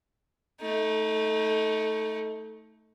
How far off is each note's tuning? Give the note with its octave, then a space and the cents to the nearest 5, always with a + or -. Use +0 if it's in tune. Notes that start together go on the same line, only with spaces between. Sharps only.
A3 +0 D#4 +30